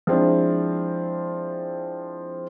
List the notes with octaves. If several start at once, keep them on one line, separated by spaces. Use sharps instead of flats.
F3 G#3 C4 D4 E4